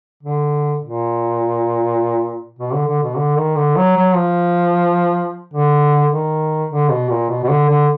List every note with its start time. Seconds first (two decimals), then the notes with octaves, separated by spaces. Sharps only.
0.23 D3
0.82 A#2
2.59 B2
2.74 D3
2.87 D3
3.03 B2
3.17 D3
3.37 D#3
3.56 D3
3.76 F#3
3.96 F#3
4.15 F3
5.53 D3
6.12 D#3
6.71 D3
6.91 B2
7.09 A#2
7.29 B2
7.43 B2
7.49 D3
7.69 D3